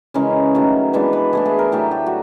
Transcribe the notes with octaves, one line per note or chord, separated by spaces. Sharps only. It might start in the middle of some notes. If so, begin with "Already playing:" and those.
C#3 E3 G#3 C#4 A#4
D#3 F#3 A3
E3 G#3 B3 D4 B4
B4
E3 A3 D4 G#4
G#4
A#4
A2 F#3 A3 G4
G4
F#4